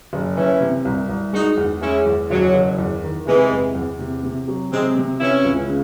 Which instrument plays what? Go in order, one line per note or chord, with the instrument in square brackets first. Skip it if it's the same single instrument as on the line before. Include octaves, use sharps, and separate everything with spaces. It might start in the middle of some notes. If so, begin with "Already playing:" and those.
[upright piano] F#1
[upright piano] E3 [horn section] C#4 E4
[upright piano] C3
C2
C2
[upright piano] G#3 [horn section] D#4 F#4
[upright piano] E2
[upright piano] G#3 [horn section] C#4 E4
[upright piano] E2
[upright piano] F#1 [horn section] F#3
[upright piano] F#1
E2
D#3
[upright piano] C3 [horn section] E3 G#3
[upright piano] E2
E2
C3
C3
F#3
[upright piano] C3 [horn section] G#3 C4
[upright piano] C3
[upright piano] E3 [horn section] C#4 E4
[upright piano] C#2
C#3